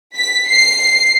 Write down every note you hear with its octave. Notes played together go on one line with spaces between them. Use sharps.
B6
C7